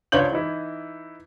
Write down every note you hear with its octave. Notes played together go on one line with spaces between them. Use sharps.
C#2 D4 C5 C#5 G6 F#7
E3 D#4 E4